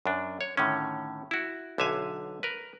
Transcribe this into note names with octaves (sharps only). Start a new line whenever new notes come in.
F#2 D4
C#5
A2 D3 D#3 C#4
E4 F#4
B1 D3 E5 F5 G#5
A#4 B4